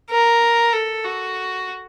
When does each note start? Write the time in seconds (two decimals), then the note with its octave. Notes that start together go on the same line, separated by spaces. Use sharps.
0.11 A#4
0.73 A4
1.04 F#4